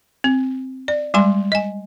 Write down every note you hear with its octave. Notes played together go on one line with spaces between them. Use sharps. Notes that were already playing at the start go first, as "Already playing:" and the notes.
C4
D5
G3 G#3 G#5 C6
D#5 G#5